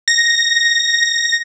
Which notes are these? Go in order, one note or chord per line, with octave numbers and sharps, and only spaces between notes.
A#6